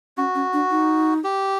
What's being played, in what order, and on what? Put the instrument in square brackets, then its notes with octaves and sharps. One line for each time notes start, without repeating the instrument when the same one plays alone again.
[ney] C#4 [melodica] F#4
[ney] C#4
D4
D#4
[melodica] G4